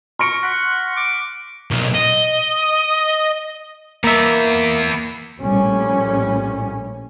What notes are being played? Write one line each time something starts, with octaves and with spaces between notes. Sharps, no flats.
C6 C#6 F6 A#6 C#7 D7
F#5 A#6 B6
D6
B1 A#2
D#5
E3 A#3 B3 E5
A#1 A2 G3 C#4